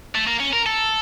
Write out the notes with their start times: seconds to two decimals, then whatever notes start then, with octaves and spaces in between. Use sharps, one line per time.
0.15 A3
0.28 A#3
0.40 C#4
0.53 A#4
0.66 A4